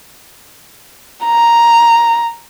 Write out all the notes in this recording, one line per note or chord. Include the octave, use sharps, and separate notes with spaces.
A#5